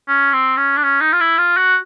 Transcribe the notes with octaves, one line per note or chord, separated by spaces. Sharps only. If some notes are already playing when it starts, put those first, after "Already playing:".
C#4
C4
C#4
D4
C#4
D#4
F4
E4
F4
F#4